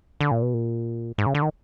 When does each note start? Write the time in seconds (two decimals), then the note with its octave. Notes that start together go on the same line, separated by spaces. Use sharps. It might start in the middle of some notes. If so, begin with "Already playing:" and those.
0.21 D3
0.31 A#2
0.42 B2
0.54 A#2
1.18 G#2
1.26 C#3
1.35 D3
1.42 D#3